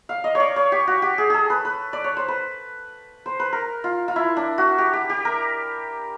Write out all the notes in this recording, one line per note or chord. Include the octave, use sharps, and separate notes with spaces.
F5
D#5
C#5
D5
C#5
G4
F#4
G4
G#4
G#4 A4
B4
B4
D5
C#5
C5
B4
C5
B4
A#4
F4
F4
E4
D4
F#4
G4
G4
G4
A#4